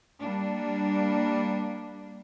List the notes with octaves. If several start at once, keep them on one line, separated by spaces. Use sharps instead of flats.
G3 A#3 D4